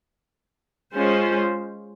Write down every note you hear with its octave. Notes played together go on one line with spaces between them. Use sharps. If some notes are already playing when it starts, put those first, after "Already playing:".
G#3 C#4 F4 C5